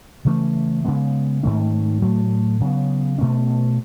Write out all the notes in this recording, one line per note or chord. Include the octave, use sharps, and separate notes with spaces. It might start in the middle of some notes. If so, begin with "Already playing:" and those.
C#3 E3 A3 C#4
C#3 G#3 B3
G#2 D#3 A3 C#4
A2 F#3 A3
C#3 F#3 B3
B2 A3 C#4